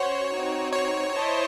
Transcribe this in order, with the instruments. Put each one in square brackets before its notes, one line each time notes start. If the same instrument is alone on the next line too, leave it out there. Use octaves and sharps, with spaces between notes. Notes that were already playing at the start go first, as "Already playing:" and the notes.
Already playing: [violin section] C#4 F#4 C5 F#5 [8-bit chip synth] C#5
[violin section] C4 D#4 F#4
[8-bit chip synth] C#5
[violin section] E4 C5 D#5 A5